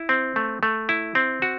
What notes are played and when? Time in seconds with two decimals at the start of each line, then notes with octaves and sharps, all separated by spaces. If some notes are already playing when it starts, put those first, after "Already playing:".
Already playing: E4
0.09 C4
0.36 A3
0.63 A3
0.89 E4
1.15 C4
1.42 F#4